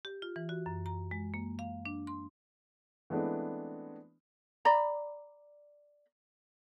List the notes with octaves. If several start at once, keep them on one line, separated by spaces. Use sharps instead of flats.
G4
F4
E3
F#4
F#2
A#5
G#3
A#3
F5
D4
C6
E3 G#3 A3 B3 C4 D4
D5 A#5 B5